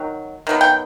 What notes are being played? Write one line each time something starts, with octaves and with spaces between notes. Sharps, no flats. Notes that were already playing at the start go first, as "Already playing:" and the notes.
Already playing: D#3 F#3
D#3 F#3 B3
G5